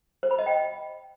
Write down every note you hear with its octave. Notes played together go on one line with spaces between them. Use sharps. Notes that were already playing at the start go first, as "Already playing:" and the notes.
C5
B5
D#5
G5